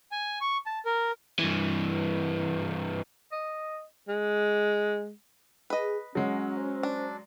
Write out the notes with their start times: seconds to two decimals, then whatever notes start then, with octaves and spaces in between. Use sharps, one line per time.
0.12 G#5
0.41 C#6
0.66 A5
0.86 A#4
1.39 G2 E3
3.32 D#5
4.08 G#3
5.70 G#4 B4 D#5
6.15 F#3 G#3 C#4 F#5
6.57 C5
6.83 D4